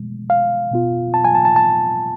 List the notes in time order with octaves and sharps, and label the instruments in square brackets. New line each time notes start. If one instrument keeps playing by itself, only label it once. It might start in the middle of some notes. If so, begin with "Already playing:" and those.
Already playing: [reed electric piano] B2 G#3
F5
B2 B3 F4
A5
G#5
A5
A5
A5